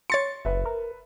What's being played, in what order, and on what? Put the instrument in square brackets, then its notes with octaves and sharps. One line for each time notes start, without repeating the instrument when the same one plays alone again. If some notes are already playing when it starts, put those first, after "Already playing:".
[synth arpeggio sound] C#5 A6 C#7 [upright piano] C6
[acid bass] F#1 [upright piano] B4 E5
[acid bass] A#4